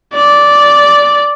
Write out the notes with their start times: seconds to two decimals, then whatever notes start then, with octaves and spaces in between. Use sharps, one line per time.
0.13 D5